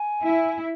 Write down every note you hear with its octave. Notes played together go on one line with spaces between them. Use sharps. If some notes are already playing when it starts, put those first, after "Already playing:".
Already playing: G#5
E4